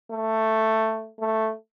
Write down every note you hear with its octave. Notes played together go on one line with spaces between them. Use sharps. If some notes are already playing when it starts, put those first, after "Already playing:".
A3
A3